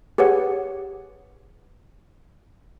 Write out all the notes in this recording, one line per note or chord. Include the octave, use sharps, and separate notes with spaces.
G4 G#4 B4 C#5 F#5